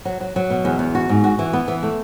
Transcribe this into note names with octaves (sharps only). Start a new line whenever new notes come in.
F#3
F#3
F#3
B2
E2
E2
F#4
G#2
F#4
E3
B3
E3
A3